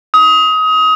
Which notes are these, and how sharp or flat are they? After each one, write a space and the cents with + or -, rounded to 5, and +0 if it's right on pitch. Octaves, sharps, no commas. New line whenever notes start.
D#6 +25